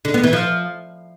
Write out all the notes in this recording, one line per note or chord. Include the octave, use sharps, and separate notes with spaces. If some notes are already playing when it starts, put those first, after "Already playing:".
D3
B3
E3
F3